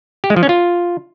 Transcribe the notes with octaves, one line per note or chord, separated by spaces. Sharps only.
G4
G#3
F3
C#4
F4